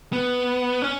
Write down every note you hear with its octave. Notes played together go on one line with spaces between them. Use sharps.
B3
C#4